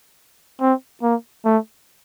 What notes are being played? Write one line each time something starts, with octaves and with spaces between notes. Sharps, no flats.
C4
A#3
A3